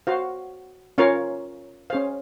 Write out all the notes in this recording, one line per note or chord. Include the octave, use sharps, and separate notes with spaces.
F#4 C5 F5
C#4 F4 A#4 C#5 F5
C#4 G#4 C5 F5